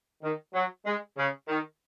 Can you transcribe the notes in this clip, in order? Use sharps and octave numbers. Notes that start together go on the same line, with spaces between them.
D#3
F#3
G#3
C#3
D#3